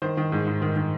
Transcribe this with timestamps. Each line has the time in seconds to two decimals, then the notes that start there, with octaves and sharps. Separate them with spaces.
0.02 D#3 C5
0.17 D#3
0.32 G#2
0.47 G#2
0.62 D#3
0.76 D#3